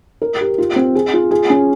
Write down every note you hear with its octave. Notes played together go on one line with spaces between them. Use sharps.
A#4
G4
F4
C4
G#4
F4
G#4
C#4